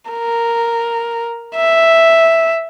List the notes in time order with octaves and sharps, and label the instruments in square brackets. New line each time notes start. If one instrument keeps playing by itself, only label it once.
[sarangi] A#4
E5